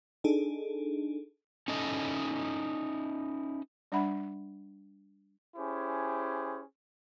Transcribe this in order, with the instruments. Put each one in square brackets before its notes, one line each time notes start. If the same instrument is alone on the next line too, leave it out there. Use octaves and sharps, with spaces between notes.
[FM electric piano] D4 D#4 G#4 A4
[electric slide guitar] C#4 D#4 E4 A4 D#5
[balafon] G3 D4 E5 F#5 B5
[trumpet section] C#4 E4 G4 G#4 C5